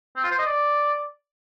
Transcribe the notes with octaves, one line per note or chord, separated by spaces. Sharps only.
C4
F4
C5
D#5
D5